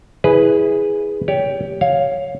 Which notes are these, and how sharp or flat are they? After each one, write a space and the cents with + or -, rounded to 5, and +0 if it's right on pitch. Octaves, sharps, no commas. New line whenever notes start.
E4 -20 G#4 +0 B4 +0
G4 +0 C#5 +30
C#5 +0 F5 +5